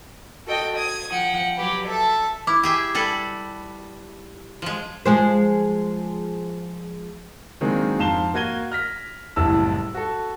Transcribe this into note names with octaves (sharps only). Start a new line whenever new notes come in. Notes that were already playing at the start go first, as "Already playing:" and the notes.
F#4 A4 D#5 G5
D#6 G#6
F3 F#5 G5
F#3 G4 B4
A4 E5
E4 D6
G4 G#4 E5
G3 A4 B4
F3 G#3
F3 G#3 C5
D#3 F#3 G#3 A#3 C4 D4
F2 G#2 F5 A5 E7 G7
A#3 F#4 G#6 D#7 G7
F6 A#6 B6
F#1 C2 A2 A5 E6
F#4 A4